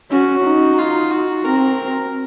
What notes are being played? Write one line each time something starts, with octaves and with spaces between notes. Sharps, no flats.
C#4 F#4
D#4
F4
F#4
C4 A#4